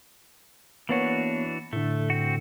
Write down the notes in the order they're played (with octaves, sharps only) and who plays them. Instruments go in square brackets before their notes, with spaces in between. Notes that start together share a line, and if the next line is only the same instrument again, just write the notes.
[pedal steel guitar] E3 D4 F#4 [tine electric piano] A#3 B3 C#5
[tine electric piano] A2 D3 [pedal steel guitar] A3
[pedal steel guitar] C4 F#4